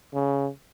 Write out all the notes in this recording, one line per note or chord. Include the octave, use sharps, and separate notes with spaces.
C#3